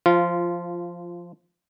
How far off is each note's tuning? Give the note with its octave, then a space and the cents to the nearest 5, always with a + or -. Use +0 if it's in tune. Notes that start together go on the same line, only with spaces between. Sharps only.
F3 +0 F4 -15